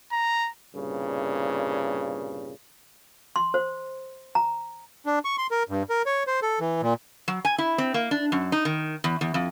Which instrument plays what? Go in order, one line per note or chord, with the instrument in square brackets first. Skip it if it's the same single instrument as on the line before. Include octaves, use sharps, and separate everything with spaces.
[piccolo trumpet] A#5
[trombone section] C2 G2 A#2 C#3
[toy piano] C6
C5
A#5
[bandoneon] D4
C#6
C6
A#4
G2
A#4
C#5
C5
A4
E3
A#2
[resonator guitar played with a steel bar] F#3
G#5
E4
C4
A#3
D4
F#2
D#4
D#3
E2
E2
F2